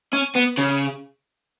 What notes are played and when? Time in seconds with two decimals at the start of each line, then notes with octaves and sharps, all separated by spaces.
0.13 C#4
0.36 B3
0.58 C#3